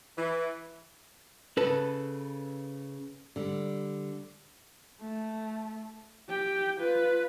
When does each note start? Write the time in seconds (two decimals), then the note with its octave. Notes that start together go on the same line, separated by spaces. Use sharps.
0.18 E3
1.57 C#3 A4 B4
3.36 D3 G3
5.00 A3
6.30 G4 G5
6.80 F4 B4